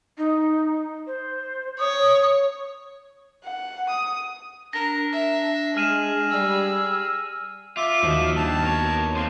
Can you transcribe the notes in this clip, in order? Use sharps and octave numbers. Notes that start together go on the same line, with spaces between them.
D#4
C5
C#5 D#6
F#5
D#6
D4 A#4 A#6
E5
G#3 G#4 F6 D#7 E7
G3 E6
F4 E5 D6
D#2 F3 F#4
G2 A5
B3 A#4 C#5
F2 F3 C6